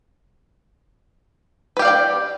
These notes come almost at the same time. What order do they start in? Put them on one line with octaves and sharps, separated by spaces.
B4 G4 F5 D5 G5